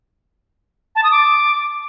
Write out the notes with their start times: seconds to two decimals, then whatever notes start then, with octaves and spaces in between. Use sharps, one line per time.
0.96 A5
1.04 D#6
1.11 D6